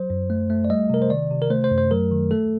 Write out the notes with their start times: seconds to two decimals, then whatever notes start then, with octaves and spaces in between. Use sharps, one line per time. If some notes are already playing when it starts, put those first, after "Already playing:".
Already playing: F#3 C5
0.10 F#2
0.30 A3
0.50 A3
0.65 D5
0.70 G3 D#5
0.90 C3 A#4
1.02 C5
1.10 D#3 D5
1.31 C3
1.42 A#4
1.50 A3 C5
1.64 C5
1.71 F#2
1.78 C5
1.91 F#3 A#4
2.11 D#3
2.31 A3 A4